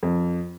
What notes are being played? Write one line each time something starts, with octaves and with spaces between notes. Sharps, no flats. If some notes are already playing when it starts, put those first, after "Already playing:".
F2